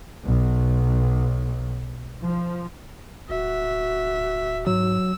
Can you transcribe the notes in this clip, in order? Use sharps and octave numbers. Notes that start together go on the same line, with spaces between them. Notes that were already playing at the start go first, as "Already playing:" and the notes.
B1
F3
D1 F#4 E5
G#2 F#3 E6